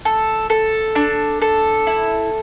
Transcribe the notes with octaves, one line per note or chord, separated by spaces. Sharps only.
A4
A4
D4
A4
E4